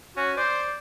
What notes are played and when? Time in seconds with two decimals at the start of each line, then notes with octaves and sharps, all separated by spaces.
0.17 C#4 F#4
0.37 C5 D5